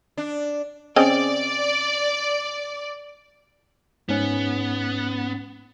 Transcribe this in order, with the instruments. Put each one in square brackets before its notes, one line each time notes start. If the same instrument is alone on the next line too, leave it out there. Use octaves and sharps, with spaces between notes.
[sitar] D4
[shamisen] C#3 C4 D#5 [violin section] D5
[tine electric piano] G#2 C#4 [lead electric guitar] B3